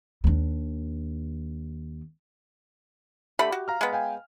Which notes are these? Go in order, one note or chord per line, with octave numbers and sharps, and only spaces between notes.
D#2 D4
D3 A3 G4 B5
F#4
F5 A#5 F6
G#3 B3
F5 G5 G#5